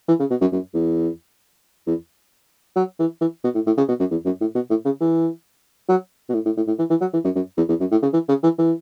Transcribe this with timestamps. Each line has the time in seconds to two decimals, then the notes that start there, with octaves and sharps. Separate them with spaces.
0.08 E3
0.20 C#3
0.30 B2
0.41 F#2
0.52 F#2
0.74 E2
1.87 E2
2.76 F#3
2.99 E3
3.21 E3
3.44 B2
3.55 A2
3.67 A2
3.78 C#3
3.89 B2
4.00 F#2
4.11 E2
4.25 F#2
4.41 A2
4.55 B2
4.70 A2
4.85 C#3
5.01 E3
5.89 F#3
6.29 B2
6.34 A2
6.45 A2
6.57 A2
6.67 A2
6.79 E3
6.90 E3
7.01 F#3
7.13 E3
7.25 F#2
7.36 F#2
7.57 E2
7.69 E2
7.80 F#2
7.91 A2
8.02 C#3
8.13 E3
8.29 C#3
8.43 E3
8.59 E3